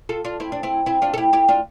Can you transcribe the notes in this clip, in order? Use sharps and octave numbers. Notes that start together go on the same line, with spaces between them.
F4 A4
D4 F4
C4 E4
D4
C4 E4
C4 E4
D4 F4
A4
E4 G4
E4 G4
D4 F4